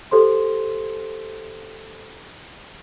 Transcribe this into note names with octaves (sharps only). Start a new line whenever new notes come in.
G4 A4 C5 C6